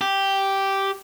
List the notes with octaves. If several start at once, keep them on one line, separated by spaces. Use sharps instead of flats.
G4